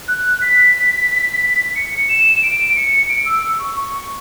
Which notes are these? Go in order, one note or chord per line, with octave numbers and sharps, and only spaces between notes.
F#6
B6
C#7
E7
D7
C#7
D7
E6
E6
C#6
C#6